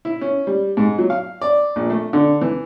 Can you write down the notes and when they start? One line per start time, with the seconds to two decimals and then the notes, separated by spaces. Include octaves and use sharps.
0.05 E4
0.21 C#4
0.47 G3
0.77 G#2
0.98 F#3
1.10 F5
1.42 D5
1.76 A#1
1.90 A3
2.13 D3
2.41 E3